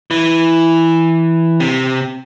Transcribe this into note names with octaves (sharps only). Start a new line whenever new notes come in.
E3
C3